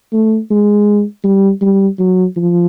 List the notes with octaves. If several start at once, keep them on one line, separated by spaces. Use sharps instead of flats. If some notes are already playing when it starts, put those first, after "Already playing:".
A3
G#3
G3
G3
F#3
F3